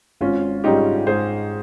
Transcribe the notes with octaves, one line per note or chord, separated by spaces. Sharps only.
G#1 C#4 F4
G#2 G3 C#4 D#4 F4 G4
G#2 G#4 C5